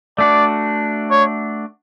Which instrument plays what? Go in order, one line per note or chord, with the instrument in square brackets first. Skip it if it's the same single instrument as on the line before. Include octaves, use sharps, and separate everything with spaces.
[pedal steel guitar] A3 D4 F#4 [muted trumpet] D5
[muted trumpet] C#5